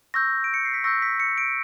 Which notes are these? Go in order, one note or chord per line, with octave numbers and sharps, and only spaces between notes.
C#6 E6 G6 A#6
D7
C#7
C7
B6
C#6 E6 G6 A#6
B6
C#7
D7